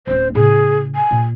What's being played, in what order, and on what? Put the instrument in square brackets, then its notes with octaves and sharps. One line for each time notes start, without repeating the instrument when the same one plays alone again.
[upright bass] D1 C#4 [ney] C5
[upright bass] A2 C#3 [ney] G#4
[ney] G#5
[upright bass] A#2